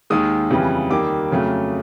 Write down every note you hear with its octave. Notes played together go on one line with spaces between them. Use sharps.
D#2 D#3 G#3 D#6
F2 C#3 E3 G3
D#2 D#3 G3 A#3 D6
F2 C#3 F#3 A3